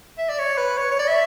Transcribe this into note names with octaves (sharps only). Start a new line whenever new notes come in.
E5
D5
C#5
B4
C#5
C#5
D5
E5